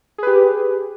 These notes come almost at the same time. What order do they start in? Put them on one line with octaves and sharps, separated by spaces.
G#4 B4 G4